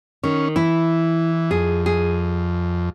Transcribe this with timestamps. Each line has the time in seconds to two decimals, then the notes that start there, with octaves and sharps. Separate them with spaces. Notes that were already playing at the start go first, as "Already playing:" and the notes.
0.24 D#3 C#4
0.56 E3 E4
1.51 F2 G#4
1.86 G#4